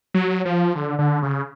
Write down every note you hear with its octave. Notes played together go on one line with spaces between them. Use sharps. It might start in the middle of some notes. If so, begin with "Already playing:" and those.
F#3
F3
D3
D3
C#3